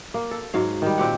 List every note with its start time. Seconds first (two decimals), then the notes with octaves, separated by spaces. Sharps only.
0.14 A#3
0.31 A4
0.54 G#2 F#3 F5
0.82 D#3 G3
0.98 A#2 C4 G4 F#5